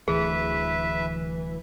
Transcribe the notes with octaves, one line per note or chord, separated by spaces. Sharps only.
D1 D2 E3 G#4 B4 E5